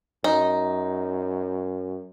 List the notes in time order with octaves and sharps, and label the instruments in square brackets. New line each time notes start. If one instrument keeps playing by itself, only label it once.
[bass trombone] F#2 [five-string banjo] D#4